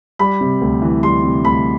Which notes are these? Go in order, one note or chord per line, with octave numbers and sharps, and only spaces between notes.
G3 B5
C3
D2
E3
G3 C6
C3
D2 B5